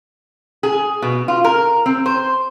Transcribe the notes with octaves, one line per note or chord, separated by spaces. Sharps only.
G#4
B2
F4
A#4
C4
C5